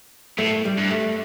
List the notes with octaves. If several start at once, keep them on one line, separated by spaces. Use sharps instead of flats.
A2 A3
G3
G2
A3